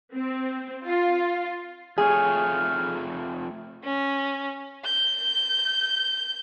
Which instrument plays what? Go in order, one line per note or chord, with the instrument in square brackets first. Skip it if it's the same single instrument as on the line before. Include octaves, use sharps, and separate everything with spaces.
[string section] C4
F4
[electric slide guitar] F2 A3 C#5 [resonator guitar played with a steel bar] G#4 [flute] F6
[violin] C#4
G6